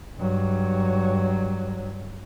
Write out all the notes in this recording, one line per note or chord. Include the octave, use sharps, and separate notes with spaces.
G2 F#3